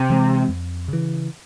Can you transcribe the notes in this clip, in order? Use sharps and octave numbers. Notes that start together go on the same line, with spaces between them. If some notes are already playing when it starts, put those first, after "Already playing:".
Already playing: C3
E3 G#3 C4
F2
C#3 E3